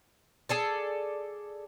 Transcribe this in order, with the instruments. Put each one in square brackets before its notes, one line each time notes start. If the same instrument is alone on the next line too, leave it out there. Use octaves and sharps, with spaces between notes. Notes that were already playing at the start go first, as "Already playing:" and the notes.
[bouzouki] G#4 A4 D5